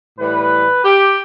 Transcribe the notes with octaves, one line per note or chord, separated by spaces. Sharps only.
A2 E3 G3 B4
G4